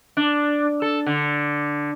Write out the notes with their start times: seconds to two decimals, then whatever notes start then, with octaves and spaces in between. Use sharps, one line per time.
0.17 D4
0.82 A4
1.06 D3